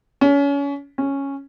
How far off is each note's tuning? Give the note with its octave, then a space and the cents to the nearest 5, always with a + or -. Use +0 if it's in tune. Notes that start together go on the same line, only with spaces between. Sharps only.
C#4 +30
C#4 -5